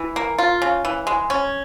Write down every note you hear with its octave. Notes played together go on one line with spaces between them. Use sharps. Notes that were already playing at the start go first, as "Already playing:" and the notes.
Already playing: E3
A#3
F4
C#3
E3
G#3
C#4